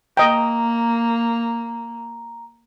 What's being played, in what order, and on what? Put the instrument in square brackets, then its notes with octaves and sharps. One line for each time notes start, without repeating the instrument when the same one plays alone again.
[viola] A#3 [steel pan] D#5 G5 [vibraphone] A#5